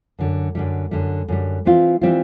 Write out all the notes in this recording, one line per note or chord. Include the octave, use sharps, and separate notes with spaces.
F#2 D3 G3
F#2 D3 G3
F#2 D3 G3
F#2 D3 G3
E3 G3 C4 F4
E3 G3 C4 F4